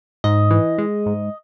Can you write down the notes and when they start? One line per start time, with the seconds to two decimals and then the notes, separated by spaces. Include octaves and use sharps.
0.24 G#2 D#5
0.51 E3
0.78 G#3
1.06 G#2